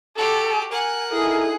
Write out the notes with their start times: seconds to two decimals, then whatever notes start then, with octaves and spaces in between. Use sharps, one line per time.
0.16 F#4 G4 A4
0.71 A#4 F#5 G#5
1.11 D#4 E4 G#4 A4